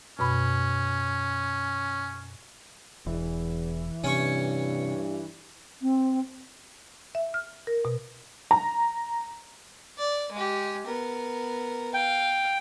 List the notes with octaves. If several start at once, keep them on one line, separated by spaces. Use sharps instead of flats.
F#2 B2 C#4 B5
E1 E2 E3
G2 C3 C#4 C#5 C#6
C4
E5
F6
A#4
B2
A#5
D5
G#3 G4
B3 A#4
F5 G5